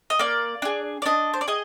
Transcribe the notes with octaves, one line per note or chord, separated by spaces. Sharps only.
D#5
A#3 D5
D4 G#4
D5
D4 D#5
C5
D5
G#4 D#5